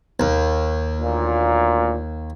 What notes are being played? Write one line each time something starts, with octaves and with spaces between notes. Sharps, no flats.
D#2
D2 A#2